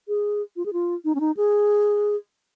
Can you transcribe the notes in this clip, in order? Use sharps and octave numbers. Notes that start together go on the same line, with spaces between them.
G#4
F4
G#4
F4
D#4
C#4
D#4
G#4